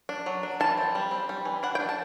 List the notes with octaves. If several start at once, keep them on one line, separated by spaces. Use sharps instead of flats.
D4
F#3
D4
E3 A5
C4
G3
C4
G3
E3
D4 F#5
G5
D4
A5